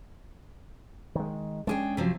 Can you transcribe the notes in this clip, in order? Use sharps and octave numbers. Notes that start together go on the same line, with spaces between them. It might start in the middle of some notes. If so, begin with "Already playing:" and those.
D#3 G#3
G#3 A3 C#4 D4 G#4 G5
C3 F3 F#3